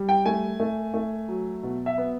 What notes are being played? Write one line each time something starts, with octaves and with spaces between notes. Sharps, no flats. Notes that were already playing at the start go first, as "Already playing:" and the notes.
Already playing: G3
G5
A3 G#5
A3
A3
F#3
B2
E5
B3